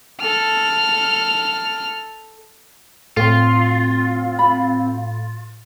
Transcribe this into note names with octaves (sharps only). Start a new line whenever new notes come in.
A4 F6
A2 C4 F4
B5